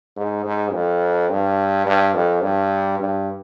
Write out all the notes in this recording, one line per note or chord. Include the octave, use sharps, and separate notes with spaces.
G#2
G#2
F2
G2
G2
F2
G2
G2